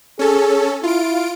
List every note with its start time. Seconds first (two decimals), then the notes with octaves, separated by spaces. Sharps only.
0.19 C#4 G#4 A4
0.83 E4 F4 D7